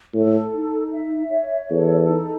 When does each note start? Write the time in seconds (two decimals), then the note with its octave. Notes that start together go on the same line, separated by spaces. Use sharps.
0.14 A2 A4
0.54 D#4
0.92 E5
1.31 C#5
1.70 E2 A4
2.09 D#4